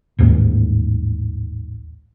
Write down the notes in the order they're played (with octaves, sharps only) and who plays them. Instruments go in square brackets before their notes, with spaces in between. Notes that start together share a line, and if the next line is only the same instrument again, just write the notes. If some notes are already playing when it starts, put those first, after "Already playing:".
[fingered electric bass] A1 D#2 G#2 A#3